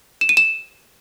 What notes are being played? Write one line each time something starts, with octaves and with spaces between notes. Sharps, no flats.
E7
D#7
E7